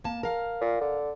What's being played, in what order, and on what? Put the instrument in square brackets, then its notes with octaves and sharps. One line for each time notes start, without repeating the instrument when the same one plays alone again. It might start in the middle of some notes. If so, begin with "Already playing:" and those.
[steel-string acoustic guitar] A#3 A5
A#4 F5
[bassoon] A#2
D3